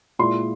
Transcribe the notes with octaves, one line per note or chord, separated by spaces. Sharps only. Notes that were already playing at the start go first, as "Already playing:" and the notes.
A#2 G#3 E4 C6